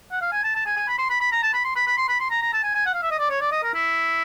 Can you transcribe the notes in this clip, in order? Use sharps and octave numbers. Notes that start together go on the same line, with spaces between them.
F#5
F5
G#5
A5
A5
G#5
G#5
B5
C6
B5
B5
A#5
A5
B5
C6
B5
B5
C6
B5
C6
A#5
A#5
A5
G#5
G#5
F#5
F5
E5
D#5
D5
C#5
D5
D#5
A#4
E4